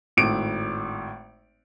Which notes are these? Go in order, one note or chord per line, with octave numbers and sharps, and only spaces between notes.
G#1 A2 D7